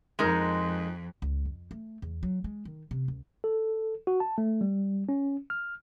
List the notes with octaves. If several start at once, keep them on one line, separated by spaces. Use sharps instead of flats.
F2 G#3 D#4 A#4
C#2
F2
A3
E2
F#3
G#3
D#3
C3
C#2
A4
F#4
A5
A3
G3
C#4
F6